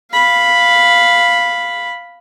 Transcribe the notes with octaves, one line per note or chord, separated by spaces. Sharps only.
F5 B5